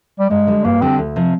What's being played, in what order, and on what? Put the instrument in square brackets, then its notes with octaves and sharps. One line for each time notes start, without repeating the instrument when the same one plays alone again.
[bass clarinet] G3
[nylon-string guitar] G2 [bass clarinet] G#3
[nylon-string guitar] D3 G3
[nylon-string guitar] G2 [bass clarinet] A#3
[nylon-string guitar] D3 G3 [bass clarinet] C4
[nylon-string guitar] D2
C3 F3